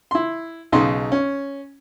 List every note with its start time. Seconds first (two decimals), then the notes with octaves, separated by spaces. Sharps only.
0.11 E4 C6
0.72 B1 C#3 D#4 C6
1.12 C#4